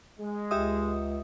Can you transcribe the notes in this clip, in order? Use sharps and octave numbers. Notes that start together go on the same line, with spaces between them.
G#3
C#2 G4 E5 D#6